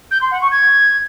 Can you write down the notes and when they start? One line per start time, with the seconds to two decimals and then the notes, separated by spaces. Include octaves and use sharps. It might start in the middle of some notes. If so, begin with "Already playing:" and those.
0.11 G6
0.21 C6
0.31 F#5
0.41 C#6
0.51 G#6